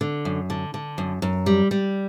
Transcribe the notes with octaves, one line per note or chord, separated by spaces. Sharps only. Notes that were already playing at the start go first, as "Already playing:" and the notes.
D3
F#2
D3
D3
F#2
F#2
G3
G3